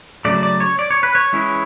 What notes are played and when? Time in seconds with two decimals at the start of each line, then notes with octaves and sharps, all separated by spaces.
0.25 C#3 F#3 A3 D5
0.43 D5
0.60 C#5
0.79 D5
0.91 C#5
1.03 B4
1.15 C#5
1.33 E3 G#3 C#4 E4